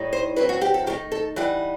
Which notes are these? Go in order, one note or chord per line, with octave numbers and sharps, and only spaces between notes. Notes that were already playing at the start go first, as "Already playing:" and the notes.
Already playing: A2 G3 D#4
C5
F#3 C4 E4 B4
F#4
G4
A4
D#3 A3 D#4 G4
A4
E3 G3 D#4 F#5